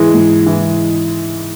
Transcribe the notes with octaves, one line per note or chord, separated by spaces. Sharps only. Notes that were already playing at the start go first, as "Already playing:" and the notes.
Already playing: G#2 E3 G#3
G#2
E3